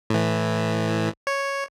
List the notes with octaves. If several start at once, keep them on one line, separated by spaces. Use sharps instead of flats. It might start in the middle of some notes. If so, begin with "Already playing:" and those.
A2 E3
C#5